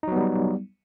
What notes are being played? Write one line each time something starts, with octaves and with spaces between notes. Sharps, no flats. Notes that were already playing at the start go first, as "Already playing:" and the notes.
F#3 G3 B3 D#4